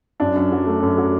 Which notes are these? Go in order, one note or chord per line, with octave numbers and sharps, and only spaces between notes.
F#2 D4
F#2
F#3
A3
F#2
F#3